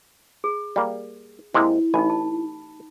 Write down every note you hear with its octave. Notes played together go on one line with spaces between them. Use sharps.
G#4
G3 A#3
C3 G#3 A#3 E4
A1 D#4 G#5 B5
A5